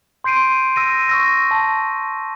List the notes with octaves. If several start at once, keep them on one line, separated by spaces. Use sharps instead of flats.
C6 G6 C7 D7 D#7
E6 A#6 D#7
C#6 E6 A#6
A5